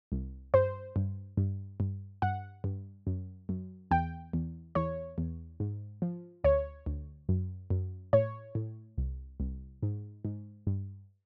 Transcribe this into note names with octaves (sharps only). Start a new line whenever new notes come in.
C2
G2 C5
G2
G2
G2
G2 F#5
G2
F#2
F#2
E2 G5
E2
E2 C#5
E2
G#2
F3
D2 C#5
D2
F#2
F#2
A2 C#5
A2
C2
C2
G#2
G#2
G2